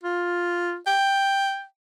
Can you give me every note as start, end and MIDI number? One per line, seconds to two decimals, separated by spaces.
0.03 0.77 65
0.87 1.64 79